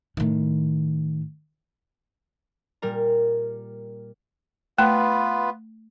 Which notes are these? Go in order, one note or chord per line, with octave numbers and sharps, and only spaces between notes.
A2 D#3
A#2 G3 A#4 A#5
A3 B3 F4 B4